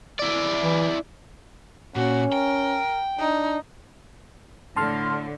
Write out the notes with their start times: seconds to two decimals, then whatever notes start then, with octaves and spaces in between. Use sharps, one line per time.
0.19 E4 D5
0.63 E3
1.96 A#2 C#4 F#4
2.33 A#4 G5
3.19 D4 D#4
4.76 A2 D3 A5 C6 F6